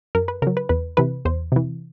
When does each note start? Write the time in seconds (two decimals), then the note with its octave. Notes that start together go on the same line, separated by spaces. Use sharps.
0.15 F#2 A#4
0.28 B4
0.42 C#3 A#4
0.47 F#3
0.57 B4
0.69 E2 B4
0.97 C3 E3 B4
1.25 E2 C5
1.52 C3 E3